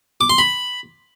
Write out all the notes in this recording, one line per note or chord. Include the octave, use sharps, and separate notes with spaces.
D6
C6
B5